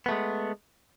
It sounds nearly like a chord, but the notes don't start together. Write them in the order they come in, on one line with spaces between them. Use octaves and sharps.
B3 A3 G#3